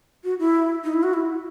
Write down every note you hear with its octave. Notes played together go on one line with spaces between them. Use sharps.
F#4
E4
D#4
E4
F#4
E4